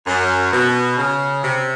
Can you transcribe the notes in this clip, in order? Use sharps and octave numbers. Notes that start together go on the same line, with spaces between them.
F#2
B2
C#3
C3